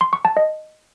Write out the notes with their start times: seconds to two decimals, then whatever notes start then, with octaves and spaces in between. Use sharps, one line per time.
0.01 C6
0.13 C#6
0.25 A5
0.37 D#5